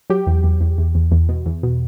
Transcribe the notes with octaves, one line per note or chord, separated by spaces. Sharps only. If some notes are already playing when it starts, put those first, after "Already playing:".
F#3 G4
E2
E2
E2
E2
E2
E2
B2
E2
B2